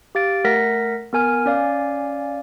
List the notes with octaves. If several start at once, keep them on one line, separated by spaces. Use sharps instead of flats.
G4 F5 A6 D7
A3 A#4 F#5 A#6 B6
B3 A#4 G#5 F6
C#4 D5 F5 G#5